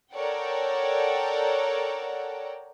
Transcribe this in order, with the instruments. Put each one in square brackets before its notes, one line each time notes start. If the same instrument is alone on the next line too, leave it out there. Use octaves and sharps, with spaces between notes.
[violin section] A4 A#4 C#5 D5 F#5 G5